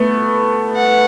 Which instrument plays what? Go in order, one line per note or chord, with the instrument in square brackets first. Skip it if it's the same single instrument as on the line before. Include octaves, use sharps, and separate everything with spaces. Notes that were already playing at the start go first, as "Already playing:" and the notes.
Already playing: [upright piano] A3 B3
[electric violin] F#5